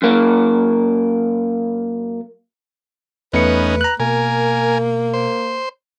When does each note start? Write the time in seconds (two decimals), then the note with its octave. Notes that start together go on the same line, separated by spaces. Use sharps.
0.02 F#2 A#3
3.33 E2 A3 B3 C#4 D#4 B4 C#7
3.81 A#5 F#6
4.00 B2 A#3 A#4 G#5
5.14 C5